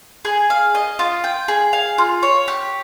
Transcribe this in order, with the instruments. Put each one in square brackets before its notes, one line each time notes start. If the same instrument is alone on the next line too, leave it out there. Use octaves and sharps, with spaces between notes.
[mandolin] G#4
F5
D#5
F4
G5
G#4
F5
F4
C#5
G4